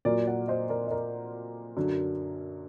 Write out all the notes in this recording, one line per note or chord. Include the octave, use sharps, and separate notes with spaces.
A#2 F#3 A#4 D5
D5 F#5
C5 D#5
A#4 D5
D#5
A#4 D5
F#2 D3 F#3